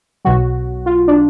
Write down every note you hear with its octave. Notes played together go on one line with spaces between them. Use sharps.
B1 B2 F#3 F#4
F4
D4